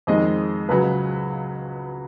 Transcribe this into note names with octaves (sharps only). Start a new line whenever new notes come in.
F2 D#3 G#3 D#5
C#2 C#3 F#3 B4